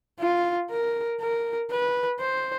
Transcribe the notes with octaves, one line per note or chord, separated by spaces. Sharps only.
F4
A#4
A#4
B4
C5